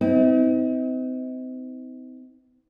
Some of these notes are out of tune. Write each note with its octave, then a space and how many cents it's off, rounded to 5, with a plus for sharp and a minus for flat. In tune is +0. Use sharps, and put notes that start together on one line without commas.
C4 -35 D#4 +40